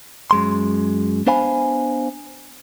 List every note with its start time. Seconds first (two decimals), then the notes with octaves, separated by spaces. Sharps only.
0.31 F#2 G#3 C6
1.27 B3 D4 C5 F5 G#5 B5